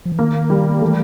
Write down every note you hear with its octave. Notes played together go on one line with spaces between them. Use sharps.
F3
E3
D#3 A#3
G3
E3 A3